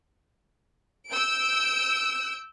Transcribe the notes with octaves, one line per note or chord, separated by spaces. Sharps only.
E6 G6 D7